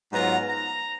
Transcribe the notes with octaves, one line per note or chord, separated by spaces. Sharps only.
G#2 F#3 B3 F4 A#5
A#5